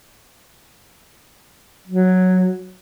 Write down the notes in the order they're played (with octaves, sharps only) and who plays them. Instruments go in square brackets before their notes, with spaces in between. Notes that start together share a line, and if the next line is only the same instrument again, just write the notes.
[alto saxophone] F#3